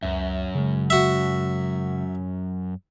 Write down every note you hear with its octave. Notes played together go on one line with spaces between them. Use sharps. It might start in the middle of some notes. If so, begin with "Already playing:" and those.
C#2 F#2 E5
C#3 G#3
F#4 E5